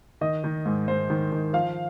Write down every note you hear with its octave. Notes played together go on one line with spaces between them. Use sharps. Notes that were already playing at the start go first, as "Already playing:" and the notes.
D#3 D#5
D#3
G#2
G#2 C5
D#3
D#3
F3 F5